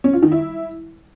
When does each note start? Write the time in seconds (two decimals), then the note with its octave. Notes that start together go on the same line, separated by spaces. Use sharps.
0.04 C#4
0.13 F4
0.22 D#3
0.32 E4